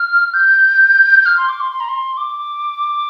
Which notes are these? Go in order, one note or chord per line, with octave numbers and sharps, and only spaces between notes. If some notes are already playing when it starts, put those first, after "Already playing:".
Already playing: F6
G6
F6
C6
D6
C6
C6
A#5
C6
D6